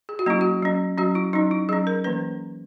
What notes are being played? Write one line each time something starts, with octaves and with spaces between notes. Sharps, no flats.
G#4
F#4
F#3 A#3 C#4 E4
F#4
F#3 C#4
F#3 C#4 F#4
E4
F#3 C#4 D#4
E4
F#3 C#4 G#4
A#4
E3 A#3 C#4 B4